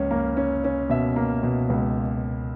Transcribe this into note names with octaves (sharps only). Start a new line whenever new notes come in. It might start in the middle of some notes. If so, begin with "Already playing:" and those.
Already playing: C#2 A#3 C#4
A#3
C#4
C#4
B2 E5
A#3
B2
C#2